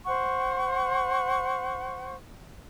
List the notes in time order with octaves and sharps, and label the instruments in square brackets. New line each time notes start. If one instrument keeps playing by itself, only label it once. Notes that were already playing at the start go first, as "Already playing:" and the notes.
[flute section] C5 F#5 C#6